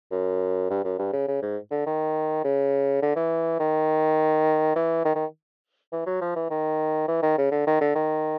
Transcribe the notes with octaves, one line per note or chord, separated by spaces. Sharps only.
F#2
G2
F#2
G2
C#3
C#3
G#2
D3
D#3
C#3
D3
E3
D#3
E3
D#3
D#3
E3
F#3
F3
E3
D#3
E3
D#3
C#3
D3
D#3
D3
D#3